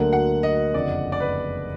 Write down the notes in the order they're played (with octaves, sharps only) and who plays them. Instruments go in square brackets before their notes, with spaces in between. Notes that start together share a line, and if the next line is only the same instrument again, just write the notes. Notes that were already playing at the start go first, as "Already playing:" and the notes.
Already playing: [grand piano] D2 D3 F#3 A#3 [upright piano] F#5
[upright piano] F#5
D#5
[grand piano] F#1 F2 D3 [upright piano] D5
[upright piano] D5
B4